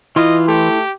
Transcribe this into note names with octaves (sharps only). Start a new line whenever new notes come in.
E3 E4 F4 D#5 C6
A3 G4